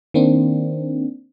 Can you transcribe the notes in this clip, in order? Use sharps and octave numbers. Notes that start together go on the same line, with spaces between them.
D#3 A#3 C4 D4